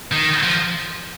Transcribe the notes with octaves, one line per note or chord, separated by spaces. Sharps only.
D#3
F3